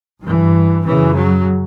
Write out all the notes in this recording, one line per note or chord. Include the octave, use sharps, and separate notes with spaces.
G2 E3
F#2 C#3 E3
F#3